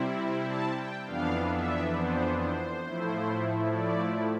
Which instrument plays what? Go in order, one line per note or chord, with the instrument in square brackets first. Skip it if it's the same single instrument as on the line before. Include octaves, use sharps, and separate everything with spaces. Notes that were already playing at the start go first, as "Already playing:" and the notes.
Already playing: [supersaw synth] C3 G3 C4 E4
A5
G5
F2 E3 B3 D4 F5
E5
C5
C5
A2 F3 A3 E4
D5